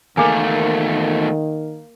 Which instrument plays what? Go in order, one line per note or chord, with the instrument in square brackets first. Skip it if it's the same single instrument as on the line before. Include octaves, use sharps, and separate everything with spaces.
[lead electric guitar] E2 A3 [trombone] D#3 [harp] A#3 F5 [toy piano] G#4 G#5